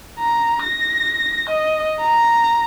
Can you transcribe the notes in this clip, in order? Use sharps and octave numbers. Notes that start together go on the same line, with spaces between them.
A#5
A#6
D#5
A#5